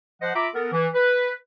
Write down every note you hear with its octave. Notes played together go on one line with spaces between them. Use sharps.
F3 C5 D#5 F#5
F4 E5 A#5 B5 D6
B3 A4 A#4
E3
B4